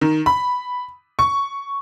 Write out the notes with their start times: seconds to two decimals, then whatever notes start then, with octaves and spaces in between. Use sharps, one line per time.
0.01 D#3
0.26 B5
1.19 C#6